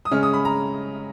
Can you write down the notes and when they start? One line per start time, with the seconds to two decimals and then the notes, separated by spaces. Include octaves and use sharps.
0.05 D#6
0.11 C#3 G#3 C#4 F6
0.23 D#6
0.33 B5
0.45 A#5